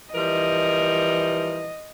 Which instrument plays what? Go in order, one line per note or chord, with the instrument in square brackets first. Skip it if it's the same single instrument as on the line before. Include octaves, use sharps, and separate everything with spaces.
[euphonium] E3 [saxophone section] F3 G3 A#4 [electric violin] D#5